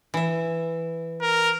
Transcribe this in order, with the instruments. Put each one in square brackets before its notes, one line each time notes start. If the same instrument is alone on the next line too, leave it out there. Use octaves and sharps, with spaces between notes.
[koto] E3 E5
[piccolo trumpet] A#4